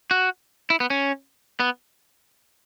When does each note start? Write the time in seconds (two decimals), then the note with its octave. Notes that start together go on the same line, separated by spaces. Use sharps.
0.11 F#4
0.70 E4
0.80 B3
0.90 C#4
1.60 B3